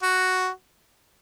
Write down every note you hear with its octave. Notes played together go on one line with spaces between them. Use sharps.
F#4